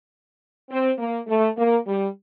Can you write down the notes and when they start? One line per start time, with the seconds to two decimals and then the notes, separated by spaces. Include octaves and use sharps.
0.70 C4
0.99 A#3
1.28 A3
1.58 A#3
1.87 G3